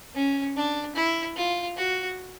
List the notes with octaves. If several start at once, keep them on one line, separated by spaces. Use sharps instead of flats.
C#4
D4
E4
F4
F#4